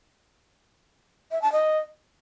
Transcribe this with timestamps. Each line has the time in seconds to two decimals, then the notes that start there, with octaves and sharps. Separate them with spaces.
1.31 E5
1.42 A5
1.52 D#5